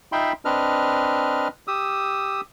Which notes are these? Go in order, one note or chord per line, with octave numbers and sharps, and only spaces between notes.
D#4 F4 E5 G5 B5 C6
C4 D4 B4 D#5 F6
G4 D#6 E6